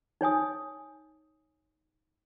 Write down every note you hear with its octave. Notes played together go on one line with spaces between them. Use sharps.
D#4 C#5 G#5 D#6